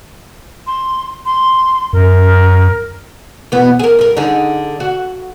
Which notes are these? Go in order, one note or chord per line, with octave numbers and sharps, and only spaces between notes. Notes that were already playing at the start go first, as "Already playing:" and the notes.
C6
C6
F#2 A#4
E2 B2 B3
G#4 A#4
G2 A#4
D3 D#4 G#4
F#4